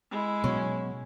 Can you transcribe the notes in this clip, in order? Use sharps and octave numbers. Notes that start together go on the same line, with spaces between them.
G#3 E4
B2 F#3 C#4